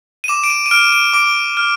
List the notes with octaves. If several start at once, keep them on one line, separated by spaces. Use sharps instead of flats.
D#7
D6 E7
D7
D#7
D#7
F6 D7
D7
D6 D7
F6